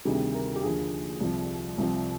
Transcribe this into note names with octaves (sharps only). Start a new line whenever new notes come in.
D2 C3 D#3 G3 G#4
A#4
G4
D#2 D3 F3 G#4
C2 C3 F3
C2 C3 F3